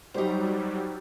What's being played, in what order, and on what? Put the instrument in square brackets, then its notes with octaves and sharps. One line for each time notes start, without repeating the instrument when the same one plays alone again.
[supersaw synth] F#3 G3 [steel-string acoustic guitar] D#4 C5 [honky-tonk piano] F#4 G4